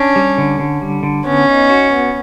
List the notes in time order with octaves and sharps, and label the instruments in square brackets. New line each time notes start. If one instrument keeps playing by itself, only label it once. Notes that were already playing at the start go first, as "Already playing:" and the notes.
Already playing: [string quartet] C#4 [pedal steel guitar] D4
[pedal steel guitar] G3
D3
D3
G3
D3
[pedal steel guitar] B3 [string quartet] C#4
[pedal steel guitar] D#4
F#4
B3